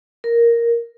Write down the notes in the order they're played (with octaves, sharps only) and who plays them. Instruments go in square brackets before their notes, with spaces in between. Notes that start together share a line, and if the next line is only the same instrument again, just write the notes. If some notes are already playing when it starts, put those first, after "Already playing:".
[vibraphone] A#4